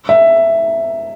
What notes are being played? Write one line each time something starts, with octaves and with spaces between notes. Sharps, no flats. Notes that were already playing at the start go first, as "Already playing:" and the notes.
E5